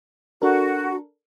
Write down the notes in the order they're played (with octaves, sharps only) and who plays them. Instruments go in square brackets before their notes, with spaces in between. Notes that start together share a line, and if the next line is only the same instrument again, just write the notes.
[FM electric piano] D4 A4 A#4 [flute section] F#4